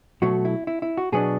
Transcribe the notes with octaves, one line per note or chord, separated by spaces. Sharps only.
B2 F#3 A3 F#4
E4
E4
E4
F#4
B2 F#3 B3 D4 G#4